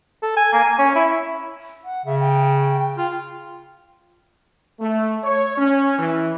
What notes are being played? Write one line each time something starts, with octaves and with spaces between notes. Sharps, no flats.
A4
G#5
A#3
G#5
C#4
E4
F#5
C#3 E5
G5
F4
A3
C#5
C#4
E3